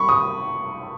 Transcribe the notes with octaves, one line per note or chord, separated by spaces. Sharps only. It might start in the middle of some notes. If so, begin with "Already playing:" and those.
Already playing: B5 C#6
D#6